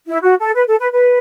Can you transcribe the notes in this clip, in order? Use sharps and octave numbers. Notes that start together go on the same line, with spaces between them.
E4
F#4
A4
B4
A4
B4
B4